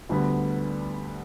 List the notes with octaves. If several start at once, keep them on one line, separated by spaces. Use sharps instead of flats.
D2 D3 G3 B3